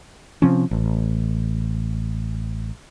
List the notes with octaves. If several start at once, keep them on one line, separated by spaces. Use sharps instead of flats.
C3 F3 C4 C#4
A1